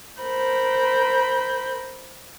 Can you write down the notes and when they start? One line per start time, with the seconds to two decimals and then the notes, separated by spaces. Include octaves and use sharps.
0.21 A#4 C5 B5 G6